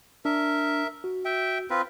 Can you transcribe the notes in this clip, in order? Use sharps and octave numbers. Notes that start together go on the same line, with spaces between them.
D4 A#4 E5
F#4
E5 G5
C4 F4 B4